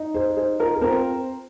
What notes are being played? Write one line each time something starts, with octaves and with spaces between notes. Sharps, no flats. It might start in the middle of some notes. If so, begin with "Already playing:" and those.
Already playing: D#4
G#4 C5
D#4 G#4 C5
F4 A#4
G#4
C4 F4 A#4